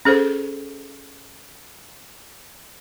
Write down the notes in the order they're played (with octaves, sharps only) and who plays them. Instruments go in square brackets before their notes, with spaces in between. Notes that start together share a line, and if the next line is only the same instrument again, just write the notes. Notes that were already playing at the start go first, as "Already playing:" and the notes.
[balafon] C#4 G#4 A4 C5